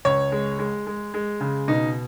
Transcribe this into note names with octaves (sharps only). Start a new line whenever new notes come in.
C#2 C#5
G#3
G#3
G#3
G#3
C#3
B2 D#4